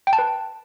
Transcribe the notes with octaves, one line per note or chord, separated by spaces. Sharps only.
G5
A5
B4